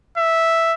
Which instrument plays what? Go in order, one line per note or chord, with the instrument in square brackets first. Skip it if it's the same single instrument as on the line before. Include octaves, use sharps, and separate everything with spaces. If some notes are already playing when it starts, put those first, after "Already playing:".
[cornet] E5